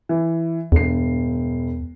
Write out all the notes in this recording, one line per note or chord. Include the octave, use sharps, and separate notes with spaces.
E3
E1 E2 G2 C7